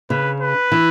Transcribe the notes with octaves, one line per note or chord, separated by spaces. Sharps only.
C#3 B4
B4
E3